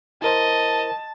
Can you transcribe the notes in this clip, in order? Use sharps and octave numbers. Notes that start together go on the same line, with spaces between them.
E4 A#4 C5 D#5 A5